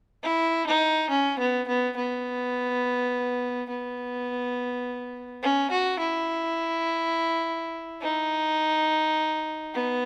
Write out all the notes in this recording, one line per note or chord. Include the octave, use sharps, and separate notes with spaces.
E4
D#4
C#4
B3
B3
B3
B3
C#4
F#4
E4
D#4
B3